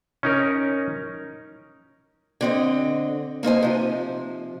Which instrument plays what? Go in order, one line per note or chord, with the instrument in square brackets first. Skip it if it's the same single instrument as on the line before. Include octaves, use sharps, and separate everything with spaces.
[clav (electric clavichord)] C#4 D#4 A#4
[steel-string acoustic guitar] D3 C4 D#5
A#3 D#4 C5 G#5
C3 F3